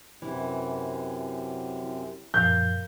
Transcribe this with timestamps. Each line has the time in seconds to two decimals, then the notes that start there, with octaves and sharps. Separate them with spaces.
0.22 F#2 C3 E3
2.34 F#2 A#2 F3 A#4 F5 G6